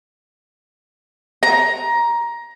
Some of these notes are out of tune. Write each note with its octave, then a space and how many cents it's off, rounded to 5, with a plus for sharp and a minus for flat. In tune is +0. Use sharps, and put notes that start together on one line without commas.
A#5 +15